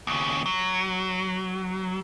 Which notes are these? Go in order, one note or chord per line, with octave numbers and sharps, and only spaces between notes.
D#2 C#3
F#3